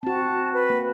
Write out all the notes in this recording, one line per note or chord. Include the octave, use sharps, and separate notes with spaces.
C4 F#4 A5
B4
A#3